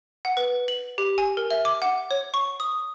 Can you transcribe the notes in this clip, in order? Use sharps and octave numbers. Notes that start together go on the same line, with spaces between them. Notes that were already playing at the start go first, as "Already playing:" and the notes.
F#5
B4
F#7
G4
G#5
A#4
E5
D6
F#5
C#5
C#6
D#6